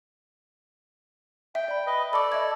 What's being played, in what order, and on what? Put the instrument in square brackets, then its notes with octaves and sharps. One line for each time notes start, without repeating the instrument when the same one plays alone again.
[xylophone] E5 [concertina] G5
[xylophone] D5 B5
[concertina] B4 D#5
[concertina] A4 D5 [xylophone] B5 C#6 D6
[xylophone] D#5 E5 G#6